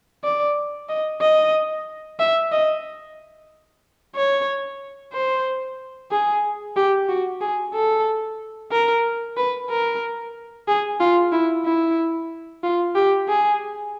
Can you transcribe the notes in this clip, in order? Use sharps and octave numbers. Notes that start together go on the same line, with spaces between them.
D5
D#5
D#5
E5
D#5
C#5
C5
G#4
G4
F#4
G#4
A4
A#4
B4
A#4
G#4
F4
E4
E4
F4
G4
G#4